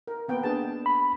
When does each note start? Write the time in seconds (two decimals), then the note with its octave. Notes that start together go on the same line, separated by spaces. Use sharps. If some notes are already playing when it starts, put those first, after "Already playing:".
0.07 A#4
0.28 A#3 B3 G5
0.43 D4 G#4 A5
0.86 B5